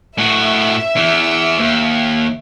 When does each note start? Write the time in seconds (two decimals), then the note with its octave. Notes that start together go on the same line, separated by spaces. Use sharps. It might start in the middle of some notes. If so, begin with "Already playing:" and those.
0.18 A2 F#4 E5
0.96 E2 E3
1.59 D#2